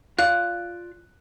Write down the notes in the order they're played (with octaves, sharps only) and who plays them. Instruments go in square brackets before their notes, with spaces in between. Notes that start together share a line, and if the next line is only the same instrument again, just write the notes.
[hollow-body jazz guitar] F4 D5 F5 [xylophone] F#6